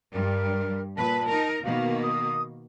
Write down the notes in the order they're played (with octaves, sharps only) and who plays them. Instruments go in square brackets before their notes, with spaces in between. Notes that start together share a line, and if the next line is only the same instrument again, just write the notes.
[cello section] G2 G3 [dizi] A#4
[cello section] A#2 B4 [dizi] A5
[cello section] D#4 A#4
[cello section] B2 D#3 A#3 [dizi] F5
[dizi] D#6